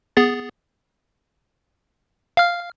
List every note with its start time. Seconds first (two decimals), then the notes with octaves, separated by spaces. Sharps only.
0.17 B3 G#4 A6
2.37 F5 F6